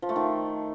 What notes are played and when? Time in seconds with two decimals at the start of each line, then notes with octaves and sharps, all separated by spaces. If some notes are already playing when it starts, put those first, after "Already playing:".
0.02 F3
0.09 A3
0.16 D#3